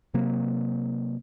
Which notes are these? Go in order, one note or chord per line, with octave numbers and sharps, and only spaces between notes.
C3 F#3 A#3